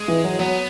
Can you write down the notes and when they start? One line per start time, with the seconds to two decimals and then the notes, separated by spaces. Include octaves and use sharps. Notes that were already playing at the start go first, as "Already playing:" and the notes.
Already playing: G#3
0.08 E3
0.24 F#3
0.39 F#3 B3